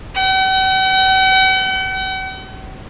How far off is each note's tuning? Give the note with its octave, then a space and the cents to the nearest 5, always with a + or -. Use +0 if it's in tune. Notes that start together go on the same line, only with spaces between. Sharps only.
F#5 +45